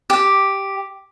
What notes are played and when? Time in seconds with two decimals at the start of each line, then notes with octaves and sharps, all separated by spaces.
0.10 G4